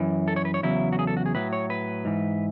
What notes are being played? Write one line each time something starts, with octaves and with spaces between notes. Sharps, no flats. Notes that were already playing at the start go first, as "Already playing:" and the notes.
Already playing: F#2 E3
A4
C#5
B4
C#5
E2 C#3 F#3 E4
F#4
G#4
A4
F#4
G#4
A2 F#3 B4
C#5
B4
G#2 E3